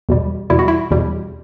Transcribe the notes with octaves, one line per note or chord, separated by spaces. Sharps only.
E2 B2 G3
E2 B2 G3 E4
F#4
E4
E2 B2 G3